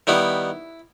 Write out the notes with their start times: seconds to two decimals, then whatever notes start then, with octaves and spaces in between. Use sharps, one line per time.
0.07 D#3 G3 B3 E4